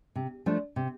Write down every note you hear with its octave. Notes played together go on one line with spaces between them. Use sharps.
C3
F3 A3 D4
C3